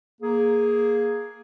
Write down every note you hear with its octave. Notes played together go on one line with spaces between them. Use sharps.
A#3 G#4